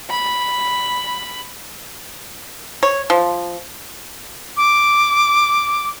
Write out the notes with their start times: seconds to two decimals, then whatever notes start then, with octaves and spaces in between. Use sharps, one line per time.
0.11 B5
2.83 C#5
3.10 F3
4.57 D6